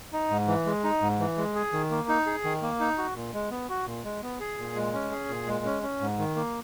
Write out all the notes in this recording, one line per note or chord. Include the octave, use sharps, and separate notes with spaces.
D#4
G#2
E3
G#3
D#4
G#2
E3
G#3
G#4
D#3
A#3
D#4
G#4
D#3
A#3
D#4
F#4
A#2
G#3
B3
F#4
A#2
G#3
B3
G#4
A#2
G#3
C#4
G#4
A#2
G#3
C#4
C#4
G#2
D#3
A#3